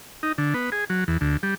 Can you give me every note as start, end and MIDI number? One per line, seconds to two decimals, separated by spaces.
0.23 0.32 63
0.38 0.54 50
0.54 0.70 59
0.72 0.85 68
0.90 1.04 54
1.08 1.18 40
1.21 1.37 38
1.43 1.55 55